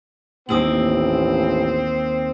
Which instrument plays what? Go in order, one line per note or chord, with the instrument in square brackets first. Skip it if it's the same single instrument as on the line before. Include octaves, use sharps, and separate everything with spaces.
[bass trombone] A1 [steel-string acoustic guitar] D#2 A#3 [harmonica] C4 [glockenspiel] D#6 E6 F#7